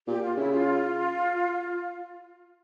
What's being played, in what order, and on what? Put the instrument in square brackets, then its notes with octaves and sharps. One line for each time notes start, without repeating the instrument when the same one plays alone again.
[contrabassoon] A#2 [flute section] G4
[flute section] F4
[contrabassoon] C#3 [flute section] E4
[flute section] F4